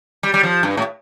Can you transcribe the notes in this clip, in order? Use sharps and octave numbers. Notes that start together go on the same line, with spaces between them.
G3
G3
F3
G2
A2